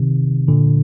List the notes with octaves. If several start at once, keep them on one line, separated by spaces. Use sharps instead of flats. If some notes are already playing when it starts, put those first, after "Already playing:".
Already playing: C3 D#3
A#2 D3